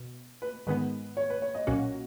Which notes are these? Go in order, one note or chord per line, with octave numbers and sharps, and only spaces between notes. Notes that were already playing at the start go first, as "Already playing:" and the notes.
Already playing: B2
B4
G#2 D#3 G#3 B3 B4
C#5
B4
C#5
D#5
B1 A#2 A#3 C#4 F#4